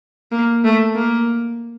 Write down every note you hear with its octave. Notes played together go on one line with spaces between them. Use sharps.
A#3
A3
A#3